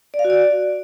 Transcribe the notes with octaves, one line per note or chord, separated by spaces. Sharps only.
D5
F5
F#4
D5